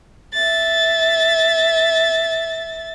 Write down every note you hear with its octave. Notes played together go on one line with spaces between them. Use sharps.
E5 A6